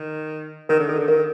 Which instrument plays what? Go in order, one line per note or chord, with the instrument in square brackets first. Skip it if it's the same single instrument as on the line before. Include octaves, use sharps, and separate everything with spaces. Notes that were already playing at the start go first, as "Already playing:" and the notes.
Already playing: [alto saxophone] D#3
[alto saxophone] D#3 [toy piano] A#4
[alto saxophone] D3
[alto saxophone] D#3 [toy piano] A4
[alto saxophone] D3
[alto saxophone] D#3 [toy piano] A#4